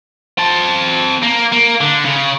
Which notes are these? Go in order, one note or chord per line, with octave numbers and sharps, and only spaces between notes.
C4 A5
A#3
A#3
D3
C#3